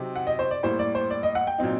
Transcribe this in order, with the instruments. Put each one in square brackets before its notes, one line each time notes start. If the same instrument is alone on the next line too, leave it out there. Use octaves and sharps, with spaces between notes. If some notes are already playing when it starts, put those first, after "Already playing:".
Already playing: [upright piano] C3 F#3 C4 D#4
F#5
D#5
C5
D5
A2 G3 A#3 C5
D5
C5
D5
D#5
F#5
G5
A#2 F#3 C4 D#4